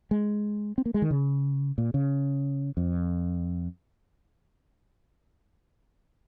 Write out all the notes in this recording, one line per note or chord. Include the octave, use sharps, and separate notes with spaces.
G#3
C4
A#3
G#3
D#3
C#3
A#2
C#3
F2